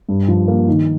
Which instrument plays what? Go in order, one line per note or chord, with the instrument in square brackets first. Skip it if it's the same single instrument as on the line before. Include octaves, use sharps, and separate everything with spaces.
[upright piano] G2
F3
A#3
D#3